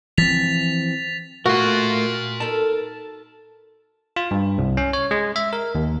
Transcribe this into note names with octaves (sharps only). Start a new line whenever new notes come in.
E3 F3 C4 A6 B6 F7
A3 F4 F#4 A#4 C6
D#4 A4 A5
F4
G2
C2
C#4
C#5
G#3
E5
A#4
D#2